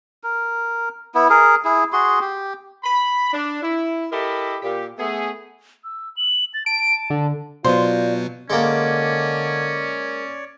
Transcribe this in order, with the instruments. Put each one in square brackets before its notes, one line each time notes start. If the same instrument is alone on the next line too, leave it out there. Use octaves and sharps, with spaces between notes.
[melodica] A#4
B3 E4
G#4 A#4
E4 G#4
F#4 G#4 C6
G4
[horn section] B5
D4
E4
E4 G4 A4 A#4 D#5 B5
A#2 G4
A3 B3 G#4
[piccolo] E6
F#7
A6
[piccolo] A5 [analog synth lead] D7
[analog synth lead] D3
[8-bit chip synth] B2 F#3 B3 [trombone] F4 [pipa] C5 [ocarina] D5
[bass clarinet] D3 [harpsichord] G#3 A#3 [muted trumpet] C#4 [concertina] C#5 D5